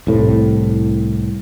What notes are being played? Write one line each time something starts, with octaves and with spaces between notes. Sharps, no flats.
C2 A2